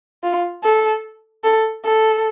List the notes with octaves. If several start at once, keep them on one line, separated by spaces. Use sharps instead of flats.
F4
A4
A4
A4